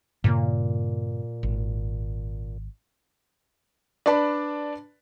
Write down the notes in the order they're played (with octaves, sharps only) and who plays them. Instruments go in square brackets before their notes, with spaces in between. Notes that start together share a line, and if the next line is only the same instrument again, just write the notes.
[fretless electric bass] G2 C#3 A#3 [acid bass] A#2
[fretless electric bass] G#1
[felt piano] D4 B4 D5 A5 B5